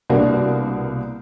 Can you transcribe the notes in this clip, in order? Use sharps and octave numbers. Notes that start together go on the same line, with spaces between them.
C2 B2 A#3 D4 F#4